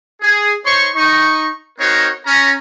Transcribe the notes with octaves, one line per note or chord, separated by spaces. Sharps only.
G#4
D#4 C5 C#5 C6 C#6
D#4 C#6
C4 D#4 F#4 A#4 C5 C#5
C#4 A#5